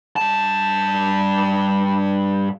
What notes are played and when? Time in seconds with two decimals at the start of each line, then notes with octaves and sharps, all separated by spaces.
0.16 G2 A5